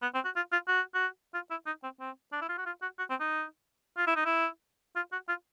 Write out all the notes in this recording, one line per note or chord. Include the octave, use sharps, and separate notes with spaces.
B3
C4
F#4
F4
F4
F#4
F#4
F4
E4
D#4
C4
C4
D4
E4
F4
F#4
F4
F#4
F#4
C4
D#4
F4
E4
D#4
E4
F4
F#4
F4